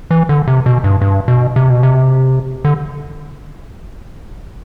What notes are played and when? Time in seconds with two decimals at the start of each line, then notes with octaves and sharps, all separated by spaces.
0.11 E3
0.29 D3
0.48 C3
0.66 B2
0.84 G2
1.01 G2
1.28 B2
1.56 C3
1.70 B2
1.83 C3
2.65 D3